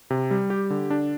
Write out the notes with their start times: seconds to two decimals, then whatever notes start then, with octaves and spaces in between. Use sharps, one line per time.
0.10 C3
0.31 G3
0.50 G4
0.70 D3
0.90 D4